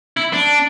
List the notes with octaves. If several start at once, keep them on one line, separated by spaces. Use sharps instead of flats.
E4
D4